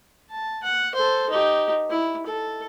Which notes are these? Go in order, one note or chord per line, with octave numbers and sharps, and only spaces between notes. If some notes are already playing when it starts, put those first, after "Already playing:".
A5
F#5
A4 C5
D#4 G4
E4
A4